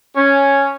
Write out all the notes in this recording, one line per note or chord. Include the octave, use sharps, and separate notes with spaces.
C#4